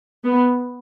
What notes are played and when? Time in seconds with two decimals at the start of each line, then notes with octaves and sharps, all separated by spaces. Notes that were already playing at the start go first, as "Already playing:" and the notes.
0.24 B3